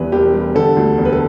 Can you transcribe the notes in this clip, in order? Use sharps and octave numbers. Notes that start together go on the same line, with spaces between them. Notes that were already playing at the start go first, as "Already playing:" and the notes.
Already playing: E1 E2 E3 G3 B4
E1 G4
G3
D3 A4
D2
E1
B4
A4